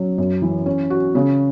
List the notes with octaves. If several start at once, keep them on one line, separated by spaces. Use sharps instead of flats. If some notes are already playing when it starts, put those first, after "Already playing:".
Already playing: F#3 C#4
F#2
E3
C#4
F#4
C#3